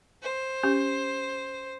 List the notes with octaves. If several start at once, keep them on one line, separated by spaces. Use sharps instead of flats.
C5
C#4 G4